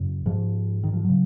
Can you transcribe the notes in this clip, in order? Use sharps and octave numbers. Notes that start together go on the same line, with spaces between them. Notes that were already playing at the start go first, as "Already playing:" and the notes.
Already playing: F#2 C#3
G#2 F3
D#3
F3
C#3 F#3